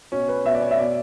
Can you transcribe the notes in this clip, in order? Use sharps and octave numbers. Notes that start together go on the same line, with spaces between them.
B2 C#4
B4
B2 E5
D5
C#5
E5
B2 D5